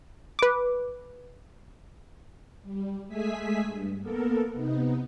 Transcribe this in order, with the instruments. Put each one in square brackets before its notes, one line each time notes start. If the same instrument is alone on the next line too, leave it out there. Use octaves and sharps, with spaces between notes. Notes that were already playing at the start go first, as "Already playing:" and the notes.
[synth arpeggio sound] B4 D6
[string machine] G3
G#3 A3 G#4 E5 G#5 B6
G2
A#3 B3 A4 A#4
C3 B3 D#4